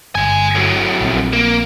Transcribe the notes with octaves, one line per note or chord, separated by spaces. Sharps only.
G1 G#3 G#5
A2 F#3
A#1 C4
A#3